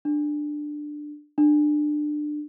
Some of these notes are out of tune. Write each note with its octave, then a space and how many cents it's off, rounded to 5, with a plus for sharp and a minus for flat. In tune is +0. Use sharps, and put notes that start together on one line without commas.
D4 +15
D4 +25